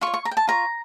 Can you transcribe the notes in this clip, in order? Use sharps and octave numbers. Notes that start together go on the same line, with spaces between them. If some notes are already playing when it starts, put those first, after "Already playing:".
F4 C#6
C#5
C#6
A#5
G5
A5
F4 C#5 A#5